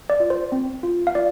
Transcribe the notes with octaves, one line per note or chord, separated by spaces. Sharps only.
D5
F4
C5
C4
F4
F5
F4 D5